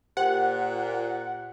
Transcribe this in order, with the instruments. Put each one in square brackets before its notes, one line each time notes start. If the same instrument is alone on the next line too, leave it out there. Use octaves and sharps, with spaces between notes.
[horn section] A#2 [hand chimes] G4 C5 G5 [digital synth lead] F#5